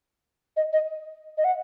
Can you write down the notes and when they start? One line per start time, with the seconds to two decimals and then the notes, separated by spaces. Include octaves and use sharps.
0.57 D#5
0.73 D#5
1.38 D#5
1.44 F#5